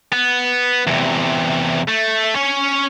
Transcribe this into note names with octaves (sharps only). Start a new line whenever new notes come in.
B3
E2 C3
A3
C#4 C#5